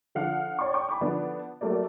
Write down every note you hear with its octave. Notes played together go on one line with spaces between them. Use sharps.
D3 F3 F5 F#5 F6
C#5 D5 G5 C6 C#6
G5 C#6
G#5 B5 D6
D3 F3 B3 D4
F#3 G3 A3 A#3 D5